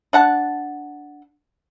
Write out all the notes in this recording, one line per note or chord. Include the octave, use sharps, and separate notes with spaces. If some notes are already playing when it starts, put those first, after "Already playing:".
D4 F#5 A5